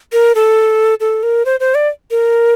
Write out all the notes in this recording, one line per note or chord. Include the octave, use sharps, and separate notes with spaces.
A#4
A4
A4
A#4
C5
C5
D5
A#4